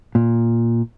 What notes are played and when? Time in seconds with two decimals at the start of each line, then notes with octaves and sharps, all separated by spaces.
0.15 A#2